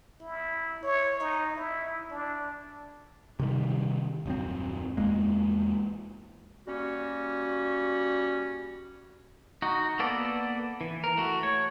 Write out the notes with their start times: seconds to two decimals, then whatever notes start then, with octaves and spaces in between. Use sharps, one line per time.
0.21 E4
0.83 C#5
1.20 D#4
1.56 E4
2.11 D4
3.39 C3 D#3 G3
4.26 D#1 F#2 C4
4.97 E2 G#3 A#3
6.67 G3 A#3 C#4 F#4
9.62 D#4 F#4
9.99 A#3 B3 A4 D5
10.81 E3
11.04 A#4
11.17 A3 F#4
11.43 C#5